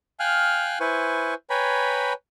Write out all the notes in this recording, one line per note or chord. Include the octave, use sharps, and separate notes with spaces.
F5 G5 G#5 F6 F#6
E4 B4 C5 G#5 C#6
B4 C#5 G5 G#5 A#5 B5